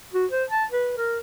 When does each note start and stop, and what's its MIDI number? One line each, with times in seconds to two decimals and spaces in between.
0.13 0.26 66
0.31 0.44 72
0.50 0.65 81
0.72 0.94 71
0.97 1.19 70